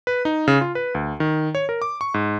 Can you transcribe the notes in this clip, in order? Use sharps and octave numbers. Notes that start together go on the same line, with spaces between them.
B4
D#4
C#3
F4
B4
D2
D#3
C#5
A#4
D6
C#6
G#2